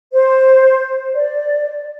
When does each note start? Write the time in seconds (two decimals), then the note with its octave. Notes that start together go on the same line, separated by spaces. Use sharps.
0.13 C5
1.14 D5